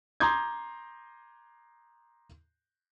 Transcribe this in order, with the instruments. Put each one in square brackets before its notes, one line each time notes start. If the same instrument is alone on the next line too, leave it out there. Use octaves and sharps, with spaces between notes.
[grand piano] A#5 C6 D6 D#6 G6 G#6